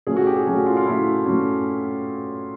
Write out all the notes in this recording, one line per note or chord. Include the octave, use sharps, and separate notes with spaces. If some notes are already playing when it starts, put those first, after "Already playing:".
A#2 F#3 A3 C#4 G#4
F#4
G4
G#4
A#2 F#3 A3 C#4
F#4
F4
F4
A#2 F#3 A3 C#4 E4
A#2 F#3 A3 C#4